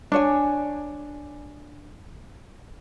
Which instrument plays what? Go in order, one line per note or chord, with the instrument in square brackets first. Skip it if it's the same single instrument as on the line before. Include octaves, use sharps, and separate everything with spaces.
[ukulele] D4 C#5 G#5